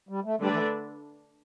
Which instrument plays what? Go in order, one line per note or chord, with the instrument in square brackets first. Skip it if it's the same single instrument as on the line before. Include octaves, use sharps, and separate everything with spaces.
[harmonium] G3
A3
[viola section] D3 A3 D4 B4 D5 [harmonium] G3
[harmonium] E3